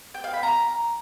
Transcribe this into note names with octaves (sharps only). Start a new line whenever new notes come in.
G5
F5
B5
A#5